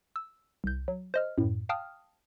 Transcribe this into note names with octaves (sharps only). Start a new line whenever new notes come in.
E6
C2 G6
F#3
C5 D#5 F6
F#2 A2
F5 G5 A5 D#6 F6